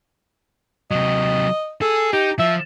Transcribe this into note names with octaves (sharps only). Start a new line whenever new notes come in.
C3 F#3 D#5
G#4 A4
D#4 G4
F3 E5